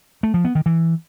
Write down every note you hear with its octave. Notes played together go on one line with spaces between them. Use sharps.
A3
F3
B3
D#3
E3